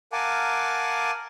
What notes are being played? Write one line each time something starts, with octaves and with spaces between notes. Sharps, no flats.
A#4 F5 F#5 G#5 A5 D6